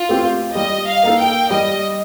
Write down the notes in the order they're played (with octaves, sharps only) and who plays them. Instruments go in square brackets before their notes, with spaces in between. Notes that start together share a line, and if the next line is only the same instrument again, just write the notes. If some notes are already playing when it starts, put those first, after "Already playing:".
Already playing: [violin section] F4
[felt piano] A3 C4 G4
[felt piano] G3 [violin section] D#5
[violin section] F5
[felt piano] A#3 D#4 A4
[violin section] G5
[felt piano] G3 [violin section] D#5